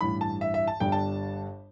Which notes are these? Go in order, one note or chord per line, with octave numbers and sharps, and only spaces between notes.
A1 G2 E3 B5
A5
E5
E5
A5
G1 G2 G3 D4 G5
A5